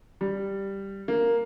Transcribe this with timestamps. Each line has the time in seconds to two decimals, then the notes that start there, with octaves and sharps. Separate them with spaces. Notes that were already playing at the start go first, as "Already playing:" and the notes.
0.21 G3
1.08 A#3